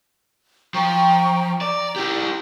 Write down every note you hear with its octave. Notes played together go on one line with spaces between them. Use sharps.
F3 G5 A#5 C#6
D5 A#5
E4 G4